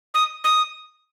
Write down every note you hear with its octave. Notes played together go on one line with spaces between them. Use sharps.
D#6
D#6